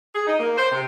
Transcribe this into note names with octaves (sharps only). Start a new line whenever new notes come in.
G#4
D#4
A#3
C5
C3